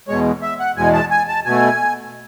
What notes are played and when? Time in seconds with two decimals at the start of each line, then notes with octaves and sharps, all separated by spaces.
0.08 E2 B2 G#3 C#5
0.42 E5
0.60 F#5
0.76 E2 B2 G#3 G#5
0.93 A5
1.11 G#5
1.28 A5
1.45 B2 A3 G#5